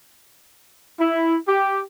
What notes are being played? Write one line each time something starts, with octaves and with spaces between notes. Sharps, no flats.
E4
G4